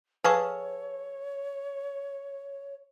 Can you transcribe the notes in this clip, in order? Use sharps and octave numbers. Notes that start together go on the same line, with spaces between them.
G#4 A4 B4 C#5 F5 C#6